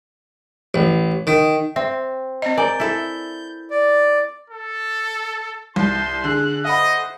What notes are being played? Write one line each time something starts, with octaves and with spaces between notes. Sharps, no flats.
A1
D#3
C4 E5
C4 D#5
A#4 D5 G#5 A#5 G6
E4 A4
D5
A4
C2 A5 C6 G6
D3 G#4 F#6
A4 C5 D#5 E5 F#5 B5